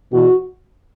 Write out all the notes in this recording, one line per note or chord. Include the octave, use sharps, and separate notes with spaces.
E2 B2 F#4